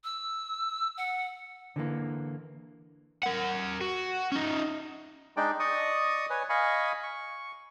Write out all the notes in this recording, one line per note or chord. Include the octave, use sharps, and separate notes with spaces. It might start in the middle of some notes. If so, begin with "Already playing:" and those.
E6
F#5
D3 E3 A#3
A#4 F#5
F#4
C#4 D#4
G#3 D4 D#4 D5 G5
D5 D#5 C#6 D#6
B4 C#5 G#5
D#5 F5 G#5 B5 C#6
C#6